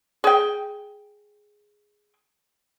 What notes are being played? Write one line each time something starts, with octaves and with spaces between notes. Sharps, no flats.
G#4 G5